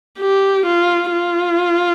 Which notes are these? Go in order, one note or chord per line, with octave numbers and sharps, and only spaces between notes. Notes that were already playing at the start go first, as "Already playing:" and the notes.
G4
F4
F4